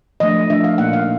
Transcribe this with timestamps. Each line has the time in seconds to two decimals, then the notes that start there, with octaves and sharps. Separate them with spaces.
0.20 F3 A3 D4 D#5
0.50 F3 A3 D4 E5
0.64 F5
0.78 A#2 F3 A#3 D#4 F#5
0.93 F5